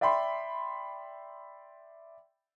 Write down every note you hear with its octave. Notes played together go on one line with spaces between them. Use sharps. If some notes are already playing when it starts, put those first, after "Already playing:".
D5 E5 G5 B5 C6